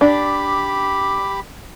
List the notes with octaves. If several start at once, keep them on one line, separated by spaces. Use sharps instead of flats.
D4 G4 B5 D6